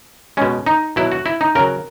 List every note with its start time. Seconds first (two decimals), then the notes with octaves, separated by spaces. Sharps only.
0.37 B2 G#3 C#4
0.66 D#4
0.96 B2 F#3 E4
1.12 F#4
1.26 E4
1.41 D#4
1.55 C#3 F#3 A#4